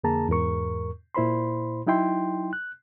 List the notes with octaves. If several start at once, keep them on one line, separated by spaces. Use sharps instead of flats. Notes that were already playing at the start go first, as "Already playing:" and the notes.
F2 D3 A#3 G#4 A5 A#5
E2 G#2 A#4 C#6
A#2 E4 C5 B5 C6
F#3 D#4 E4 G5 C6
F#6